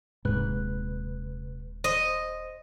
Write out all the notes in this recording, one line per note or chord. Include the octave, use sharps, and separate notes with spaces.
D#1 G#2 C3 B4 F#6
C5 D#5